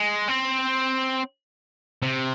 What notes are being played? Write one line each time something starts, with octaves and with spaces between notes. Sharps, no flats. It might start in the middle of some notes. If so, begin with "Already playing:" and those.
Already playing: G#3
C4
C3